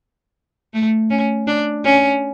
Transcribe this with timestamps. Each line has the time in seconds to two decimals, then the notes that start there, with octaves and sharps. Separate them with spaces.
0.74 A3
1.10 C#4
1.47 D4
1.84 C#4